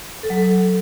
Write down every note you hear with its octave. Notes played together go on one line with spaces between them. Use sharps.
A4
F#3
A4